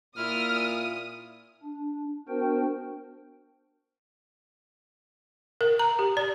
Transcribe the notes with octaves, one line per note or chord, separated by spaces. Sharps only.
A#2 E4 F4 D#6 F6
D4
B3 D4 F#4 A#4 C5 G5
A#4
A#5
G4
D5